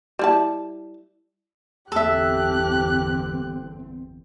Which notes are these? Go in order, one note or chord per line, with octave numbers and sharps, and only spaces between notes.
G3 E4 A5
G1 E2 C4 G4 A4 E5 F#6